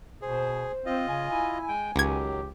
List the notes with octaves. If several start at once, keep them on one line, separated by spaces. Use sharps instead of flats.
B2 G#4 C5
C4 F4 D#5
C#3 G#5
E4
G#3 G5
C#2 D#3 F#3 G4 G#6